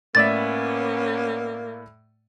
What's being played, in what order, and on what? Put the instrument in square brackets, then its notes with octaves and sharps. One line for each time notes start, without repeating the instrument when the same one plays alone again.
[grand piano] A2 D5 E5 [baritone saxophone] A#3 [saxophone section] B3 C#4 [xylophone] A6